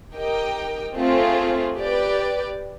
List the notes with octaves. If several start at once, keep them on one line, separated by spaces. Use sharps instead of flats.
D#4 G4 A#4 D#5 G5
A3 C4 F4 G#4
G4 B4 D5